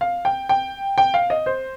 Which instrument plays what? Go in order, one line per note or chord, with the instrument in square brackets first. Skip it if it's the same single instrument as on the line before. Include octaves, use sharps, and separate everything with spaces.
[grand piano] F5
G5
G5
G5
F5
D#5
C5